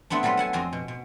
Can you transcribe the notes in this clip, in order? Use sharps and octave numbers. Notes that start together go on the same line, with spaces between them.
G3 A3 B3 C4 D4
F#3 G3 F4 A4 B4
A4 F#5 G#5 A5
F2 C4 D#5 G#5 C6
B2
B2